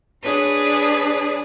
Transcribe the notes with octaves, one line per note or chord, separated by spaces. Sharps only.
D4 G#4 B4 C#5